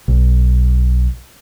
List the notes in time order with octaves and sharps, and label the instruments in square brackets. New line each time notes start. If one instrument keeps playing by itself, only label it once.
[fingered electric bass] B1